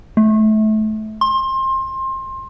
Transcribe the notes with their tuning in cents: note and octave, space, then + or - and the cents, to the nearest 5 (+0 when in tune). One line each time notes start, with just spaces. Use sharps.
A3 -25
C6 +25